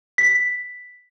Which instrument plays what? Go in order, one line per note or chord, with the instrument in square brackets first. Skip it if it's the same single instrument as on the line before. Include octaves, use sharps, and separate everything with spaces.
[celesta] B6